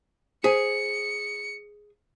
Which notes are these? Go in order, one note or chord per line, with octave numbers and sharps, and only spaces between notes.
G#4 C5 C#7